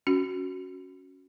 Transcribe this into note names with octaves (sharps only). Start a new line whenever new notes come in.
C#4 F#4